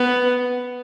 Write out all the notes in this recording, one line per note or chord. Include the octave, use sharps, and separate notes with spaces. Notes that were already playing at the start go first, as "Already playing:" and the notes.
Already playing: B3